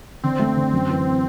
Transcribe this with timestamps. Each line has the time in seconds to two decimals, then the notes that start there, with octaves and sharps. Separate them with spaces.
0.24 D3 C4
0.39 A3
0.56 D3
0.73 F#2
0.89 E3